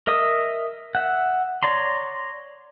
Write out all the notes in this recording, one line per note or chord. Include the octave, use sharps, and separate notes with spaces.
A#4 D#5 E5 D#6
E5 F#5
C#5 D5 A#5 C6